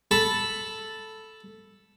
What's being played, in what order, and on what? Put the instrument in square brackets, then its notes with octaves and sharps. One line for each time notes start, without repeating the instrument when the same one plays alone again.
[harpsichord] A4 A5 B5